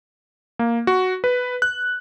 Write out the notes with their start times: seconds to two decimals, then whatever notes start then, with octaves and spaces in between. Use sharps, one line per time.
0.59 A#3
0.87 F#4
1.24 B4
1.62 F#6